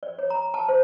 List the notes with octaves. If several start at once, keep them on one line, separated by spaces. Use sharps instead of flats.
D5
C#5
A#5
A5
C5